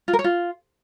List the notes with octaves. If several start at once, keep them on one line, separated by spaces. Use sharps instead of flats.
F4
A#4
C#5
F4